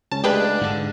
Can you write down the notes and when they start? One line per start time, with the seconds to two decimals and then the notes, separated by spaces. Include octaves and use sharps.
0.11 C#2 C#4 A5
0.24 G#3 A3 D4 G4 G#4 B4 F5
0.61 G#2 D3 F#5